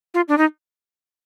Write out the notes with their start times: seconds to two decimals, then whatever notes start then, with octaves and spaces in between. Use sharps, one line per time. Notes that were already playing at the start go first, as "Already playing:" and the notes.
0.14 F4
0.28 D4
0.38 D#4